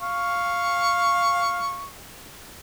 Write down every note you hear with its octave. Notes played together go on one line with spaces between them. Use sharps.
F5 C#6